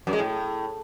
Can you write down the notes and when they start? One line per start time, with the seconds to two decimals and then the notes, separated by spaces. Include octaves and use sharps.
0.07 F#2
0.13 G#3
0.19 A2